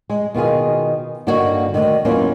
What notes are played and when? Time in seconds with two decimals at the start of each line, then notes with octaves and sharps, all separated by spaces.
0.10 G#3
0.35 B2 D#3 F4 G#4
1.27 G2 D3 A#3 D#4 F#4 C#5
1.74 D2 D#3
2.05 E2 F#3 A#3 C#4 F4